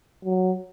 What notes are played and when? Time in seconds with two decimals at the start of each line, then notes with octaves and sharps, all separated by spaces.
0.25 F#3